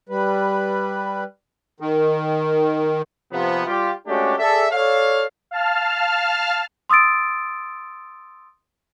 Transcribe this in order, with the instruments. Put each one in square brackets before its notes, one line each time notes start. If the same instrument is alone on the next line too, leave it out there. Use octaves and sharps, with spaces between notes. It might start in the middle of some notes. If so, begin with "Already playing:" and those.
[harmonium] G3 B4
[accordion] D#3
[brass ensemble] C3 F3 B3
G3 F4 G4
G#3 A3 C#4 D4 F#4 G4
G#4 A4 D5 E5
A4 C#5 D5 F5
[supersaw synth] F5 A5 F6
[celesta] C6 D#6 E6 A6 D7